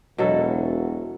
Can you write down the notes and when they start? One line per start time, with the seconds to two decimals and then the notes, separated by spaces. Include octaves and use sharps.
0.18 E1 B2 F#3 A4